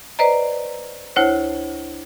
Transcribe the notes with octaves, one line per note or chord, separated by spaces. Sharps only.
B4 C5 D5 D#5 A#5
D2 E4 C5 C#5 F#6